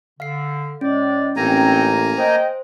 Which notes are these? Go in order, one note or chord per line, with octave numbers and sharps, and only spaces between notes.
D3 F5 C7
A2 G#3 C#4 D5
A1 A#3 C4 D#4 G#5 A#5
C5 D#5 G5